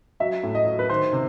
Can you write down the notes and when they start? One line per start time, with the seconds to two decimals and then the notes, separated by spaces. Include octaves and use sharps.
0.20 F#3 E5
0.43 A2
0.55 D#5
0.67 F#3
0.79 B4
0.90 D#3 C5
1.13 C3